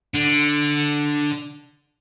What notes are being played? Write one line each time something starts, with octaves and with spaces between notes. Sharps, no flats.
D3